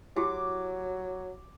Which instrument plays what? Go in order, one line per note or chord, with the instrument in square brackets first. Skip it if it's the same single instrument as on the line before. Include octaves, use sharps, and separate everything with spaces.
[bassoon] F#3 [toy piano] E4 F#4 G4 [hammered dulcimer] D6